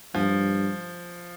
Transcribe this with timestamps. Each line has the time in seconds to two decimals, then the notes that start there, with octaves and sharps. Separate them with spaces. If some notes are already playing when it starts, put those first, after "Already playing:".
0.15 G2 F3